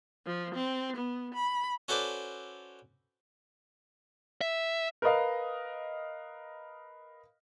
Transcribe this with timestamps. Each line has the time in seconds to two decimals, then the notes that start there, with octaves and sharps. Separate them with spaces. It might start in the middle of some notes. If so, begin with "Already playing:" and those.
0.24 F3
0.54 C4
0.96 B3
1.33 B5
1.88 C#4 F#4 A4 B4 C5 D5
4.41 E5
5.02 A#4 B4 D#5 F5